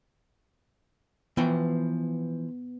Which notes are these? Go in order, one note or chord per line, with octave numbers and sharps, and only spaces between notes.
E3 F3 B3 G5